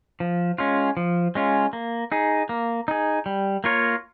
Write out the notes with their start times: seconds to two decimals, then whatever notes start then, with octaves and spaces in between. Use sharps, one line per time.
0.20 F3
0.58 G#3 C#4 F4
0.97 F3
1.35 G#3 C#4 F4
1.73 A#3
2.12 D#4 G#4
2.49 A#3
2.88 D#4 G#4
3.26 G3
3.64 A#3 F4 A#4 C#5